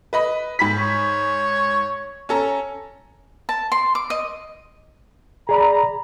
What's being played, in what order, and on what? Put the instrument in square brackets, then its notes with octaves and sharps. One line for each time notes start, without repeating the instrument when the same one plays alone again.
[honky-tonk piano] B4 D#5 B5
G#2 B5 B6
[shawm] C#5
[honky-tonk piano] C#4 A4 A#5
[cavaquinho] A5
C6
D6
D#5
[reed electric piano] G#4 D5 B5 [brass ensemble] A#5